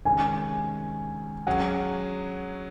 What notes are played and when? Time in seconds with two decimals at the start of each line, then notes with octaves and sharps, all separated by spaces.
0.05 C3 D#3 G#3 C#4 G#5
1.47 F#3 C#4 G#4 C#5 F#5